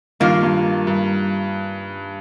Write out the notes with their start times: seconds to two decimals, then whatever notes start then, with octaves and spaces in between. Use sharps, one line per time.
0.20 G2 D#3 A#3 F4
0.43 G2
0.87 G2